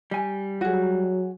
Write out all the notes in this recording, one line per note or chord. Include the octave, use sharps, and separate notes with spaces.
G3 G#5
F#3 F#4 G#4